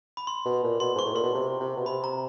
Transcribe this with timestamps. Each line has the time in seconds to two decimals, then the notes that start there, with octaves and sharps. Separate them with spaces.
0.17 B5
0.27 C6
0.45 B2
0.63 A#2
0.80 B2 C6
0.95 G#2 C#6
1.05 A2
1.14 A#2 C6
1.23 B2
1.34 C3
1.60 C3
1.76 B2
1.86 C3 B5
2.04 A#5